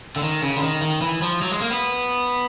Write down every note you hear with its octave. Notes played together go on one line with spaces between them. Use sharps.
D3
D#3
C#3
D3
D#3
D#3
E3
F3
F#3
G#3
A#3
B3